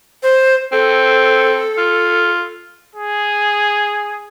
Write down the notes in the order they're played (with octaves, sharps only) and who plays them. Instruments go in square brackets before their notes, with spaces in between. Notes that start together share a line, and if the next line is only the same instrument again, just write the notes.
[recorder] C5
[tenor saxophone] C4 [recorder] A4
[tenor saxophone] F4
[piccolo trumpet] G#4